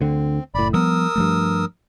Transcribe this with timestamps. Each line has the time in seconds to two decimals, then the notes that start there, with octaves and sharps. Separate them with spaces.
0.01 D2 D3 C4
0.55 F#1 A2 D5 B5
0.73 F3 G3 B3 A#4 D#6 E6
1.16 G2 F3 A3